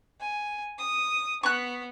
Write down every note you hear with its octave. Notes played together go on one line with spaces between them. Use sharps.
G#5
D#6
B3 C#6 F#6